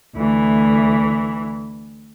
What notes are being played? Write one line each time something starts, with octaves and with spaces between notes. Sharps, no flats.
D2 E3